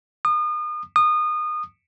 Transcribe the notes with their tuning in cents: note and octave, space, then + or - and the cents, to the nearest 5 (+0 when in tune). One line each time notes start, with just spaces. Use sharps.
D#6 -35
D#6 -25